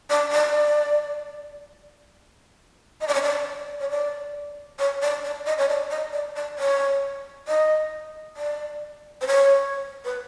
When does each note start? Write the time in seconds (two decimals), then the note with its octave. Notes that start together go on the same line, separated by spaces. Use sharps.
0.10 D5
0.32 D5
3.01 D#5
3.08 D5
3.15 C#5
3.22 D5
3.80 C#5
3.90 D5
4.79 C#5
5.02 D5
5.24 D5
5.46 D#5
5.58 C#5
5.69 D5
5.91 D#5
6.13 D5
6.36 D5
6.59 C#5
7.48 D#5
8.37 D5
9.21 C5
9.27 C#5
10.05 B4